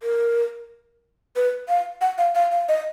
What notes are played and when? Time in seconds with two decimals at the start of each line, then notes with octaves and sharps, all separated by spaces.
0.03 A#4
1.36 B4
1.69 F5
2.01 F#5
2.18 F5
2.35 F5
2.51 F5
2.68 D#5